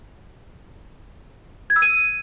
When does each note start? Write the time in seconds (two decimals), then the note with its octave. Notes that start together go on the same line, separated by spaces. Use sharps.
1.70 G#6
1.76 E6
1.82 D#7